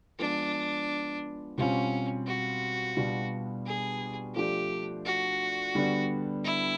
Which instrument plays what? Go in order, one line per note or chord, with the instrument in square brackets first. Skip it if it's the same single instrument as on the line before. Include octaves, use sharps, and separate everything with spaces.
[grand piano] F3 G#3 B3 [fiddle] D4
[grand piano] B2 G3 C4 F4 [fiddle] C#4
[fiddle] F#4
[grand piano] B2 G3 B3 D4 F4
[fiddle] G#4
[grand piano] F3 A3 D4 [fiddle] G4
[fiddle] F#4
[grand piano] D3 G3 B3 D4
[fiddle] E4